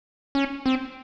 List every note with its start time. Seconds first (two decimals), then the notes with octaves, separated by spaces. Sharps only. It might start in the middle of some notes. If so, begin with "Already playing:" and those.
0.35 C#4
0.66 C4